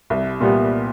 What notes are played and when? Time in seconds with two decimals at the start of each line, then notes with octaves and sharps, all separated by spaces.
0.10 C2
0.41 A#2 G3 B3